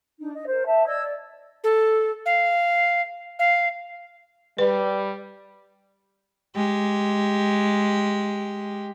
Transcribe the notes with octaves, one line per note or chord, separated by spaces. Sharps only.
D4 D#4
D#5
A#4 C5
E5 A5
D5 D#5 E6 G#6
D5
A4
F5
F5
G3 B4
G#3 G4